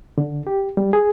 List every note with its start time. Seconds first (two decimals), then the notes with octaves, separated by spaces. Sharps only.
0.18 D3
0.47 G4
0.77 G3
0.93 G#4